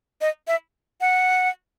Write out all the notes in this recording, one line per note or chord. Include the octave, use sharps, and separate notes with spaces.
D#5
E5
F#5